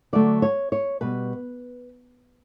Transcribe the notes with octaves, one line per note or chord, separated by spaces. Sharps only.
D3 F#3 A3 D5
C#5
C#5
B2 G3 B4